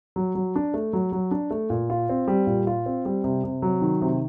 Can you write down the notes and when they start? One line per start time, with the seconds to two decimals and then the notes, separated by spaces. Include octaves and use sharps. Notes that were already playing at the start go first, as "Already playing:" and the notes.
0.16 F#3
0.35 F#3
0.56 D4
0.74 A3
0.93 F#3
1.12 F#3
1.31 D4
1.51 A3
1.70 A#2
1.90 F4
2.09 C4
2.28 G3
2.47 A#2
2.67 F4
2.86 C4
3.05 G3
3.24 C3
3.44 C3
3.62 F#3
3.81 D#3
4.02 C3